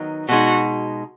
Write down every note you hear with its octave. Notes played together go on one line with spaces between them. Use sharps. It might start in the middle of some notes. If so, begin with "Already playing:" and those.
Already playing: D#3 F#3 B3 D#4
B2 G#3 D#4 F#4